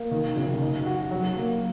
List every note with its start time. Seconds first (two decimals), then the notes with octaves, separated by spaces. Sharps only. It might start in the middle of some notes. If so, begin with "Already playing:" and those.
Already playing: A#3
0.11 D#3
0.37 F#1
0.62 D#4
0.86 F#4
1.11 F#3
1.36 A#3